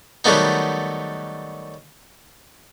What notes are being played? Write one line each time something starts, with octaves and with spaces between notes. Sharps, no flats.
D#3 F#3 G3 A3 B3 D#4